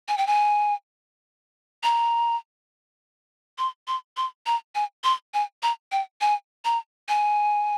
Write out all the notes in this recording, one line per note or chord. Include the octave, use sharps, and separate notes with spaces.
G#5
G5
G#5
A#5
C6
C6
C6
A#5
G#5
C6
G#5
A#5
G5
G#5
A#5
G#5